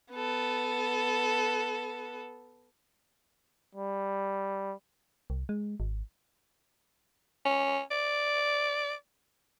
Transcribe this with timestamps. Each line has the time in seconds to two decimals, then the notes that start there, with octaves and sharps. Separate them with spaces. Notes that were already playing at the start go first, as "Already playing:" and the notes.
0.14 B3 A4
3.75 G3
5.30 C2
5.49 G#3
5.80 G#1
7.45 C#4
7.91 D5